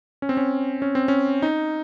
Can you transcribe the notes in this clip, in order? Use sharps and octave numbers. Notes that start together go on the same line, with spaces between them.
C#4
C4
C#4
C#4
C4
C#4
D#4